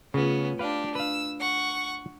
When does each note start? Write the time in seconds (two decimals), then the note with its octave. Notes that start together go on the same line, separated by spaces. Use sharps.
0.14 C#3 A3 B3 C#4 F4
0.59 D4 G4 B4 F5
0.95 D4 B4 F5 E6
1.41 F#5 C#6